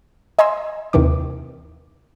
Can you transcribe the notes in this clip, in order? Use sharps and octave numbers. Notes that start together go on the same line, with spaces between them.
D#5 G#5 A#5 C6 E6
D#2 C3 D#3 E3 D6